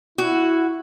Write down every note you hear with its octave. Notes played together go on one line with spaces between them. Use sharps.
E4 F#4